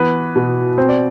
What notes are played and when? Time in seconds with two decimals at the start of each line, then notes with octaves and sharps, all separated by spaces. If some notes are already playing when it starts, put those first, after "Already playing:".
Already playing: E3 B3 B4
0.36 B2
0.78 C4 C5
0.89 D5